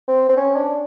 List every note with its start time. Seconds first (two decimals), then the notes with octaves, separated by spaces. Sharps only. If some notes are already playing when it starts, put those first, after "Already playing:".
0.08 C4
0.29 C4
0.37 C#4
0.56 D4